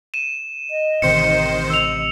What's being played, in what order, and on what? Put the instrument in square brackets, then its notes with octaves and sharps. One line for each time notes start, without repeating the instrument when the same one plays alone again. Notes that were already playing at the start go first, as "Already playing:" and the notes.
[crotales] D#7 E7
[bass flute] D#5
[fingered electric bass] A1 A2 C3 [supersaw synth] D#3 C5 [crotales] C#7
[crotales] E6 F7